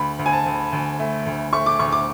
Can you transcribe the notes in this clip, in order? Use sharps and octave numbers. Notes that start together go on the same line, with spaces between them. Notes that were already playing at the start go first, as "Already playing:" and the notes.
Already playing: D2 B5
D2
G#5
A5
D2
D2
A3
D2
A3 C#6
D6
D2 C#6
D6